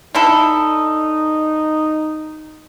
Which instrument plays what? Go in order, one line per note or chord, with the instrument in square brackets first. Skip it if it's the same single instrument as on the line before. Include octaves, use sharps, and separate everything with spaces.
[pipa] D3 E4 A4 [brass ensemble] D#4